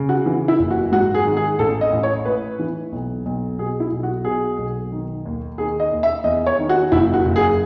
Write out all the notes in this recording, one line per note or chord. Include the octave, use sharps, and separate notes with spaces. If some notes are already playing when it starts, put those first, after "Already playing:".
Already playing: C#3
F#4
E3
E4
F#1
F#4
G#2 F#4
G#4
D#3
G#4
A1 A4
D#5
A1
C#5
A2 B4
E3
B1
B1
B2 G#4
E4
B1
F#4
B2 G#4
B1
D#3
D#2
D#3 G#4
D#5
D#2
E5
E2 D#5
C#5
D#3
F#4
F#1 E4
F#4
F#1
G#4